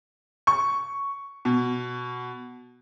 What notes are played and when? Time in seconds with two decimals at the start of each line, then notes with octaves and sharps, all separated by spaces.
0.47 C#6
1.45 B2